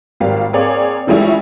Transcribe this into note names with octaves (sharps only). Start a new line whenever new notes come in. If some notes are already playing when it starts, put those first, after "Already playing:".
G#1 G3 A#3 F5
A#3 C4 G#4 A#4 C#5 D5
E3 F3 G3 G#3 C#4 E4